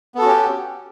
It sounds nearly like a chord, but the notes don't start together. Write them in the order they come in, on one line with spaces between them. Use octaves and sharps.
B3 A4 F#4 C#4 G4